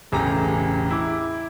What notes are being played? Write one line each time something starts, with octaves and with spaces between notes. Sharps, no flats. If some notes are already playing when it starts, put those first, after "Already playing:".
E1 A1 C#3 G4 A#5
E4 D6